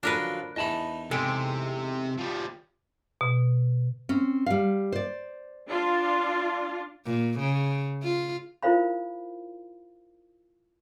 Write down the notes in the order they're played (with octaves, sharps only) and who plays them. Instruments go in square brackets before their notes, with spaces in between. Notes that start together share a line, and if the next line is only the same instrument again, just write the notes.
[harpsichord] F#2 D3 F3 [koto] D4 A#4 B4
[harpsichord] E2 E3 D#4 [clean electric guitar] D#5 A5 B5
[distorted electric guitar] C3 [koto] G#3 [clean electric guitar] A4 G5
[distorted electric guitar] F3 G3
[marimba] B2
[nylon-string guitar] C4 C#4
G3 F5
C5 D5
[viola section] D4 F4
[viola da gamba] A#2
C#3
F4
[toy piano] E4 F4 A#4 C5 F5 B5